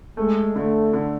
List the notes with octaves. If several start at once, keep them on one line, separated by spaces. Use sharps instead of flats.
G#3 A3
D3 A3
D3